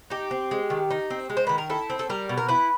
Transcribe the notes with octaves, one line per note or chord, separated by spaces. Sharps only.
D#4 G4
C4
G#3
D#3
D#4
C4
G#3
C5
D#3 B4
A#4
E4 A4
C4
A4
G3 A#4
B2
A#4
E4 B4